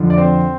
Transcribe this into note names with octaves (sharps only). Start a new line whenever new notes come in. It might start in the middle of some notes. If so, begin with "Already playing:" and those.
Already playing: F2 D3 F3
D5
C4 C5